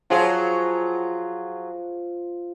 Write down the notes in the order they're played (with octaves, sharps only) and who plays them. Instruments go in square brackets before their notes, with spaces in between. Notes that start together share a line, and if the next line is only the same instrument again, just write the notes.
[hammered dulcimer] F3 F5 [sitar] F#3 F4 G#4